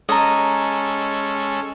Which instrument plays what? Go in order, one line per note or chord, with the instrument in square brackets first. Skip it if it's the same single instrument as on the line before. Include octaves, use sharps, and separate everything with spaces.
[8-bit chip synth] G#3 C#4 A4 [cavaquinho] D#5 A#5